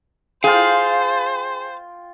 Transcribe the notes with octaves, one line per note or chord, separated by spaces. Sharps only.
F4 G#4 C5 F5 G5